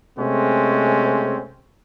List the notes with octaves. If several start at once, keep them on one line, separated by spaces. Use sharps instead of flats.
C3 G#3 A3 C4 C#4